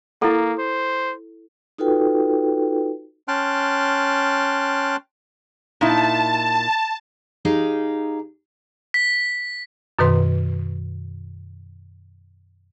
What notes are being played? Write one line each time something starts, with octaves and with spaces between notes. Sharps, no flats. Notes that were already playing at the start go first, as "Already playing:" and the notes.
A#3 E4 A4
C5
D#4 F4 F#4 A4 B4 G5
C#4 G5 A5 C6 F6 F#6
A#2 D#4 E4 A5
D#4 G4 G#4 F5
B6
F#2 B2 D#3 B4 C6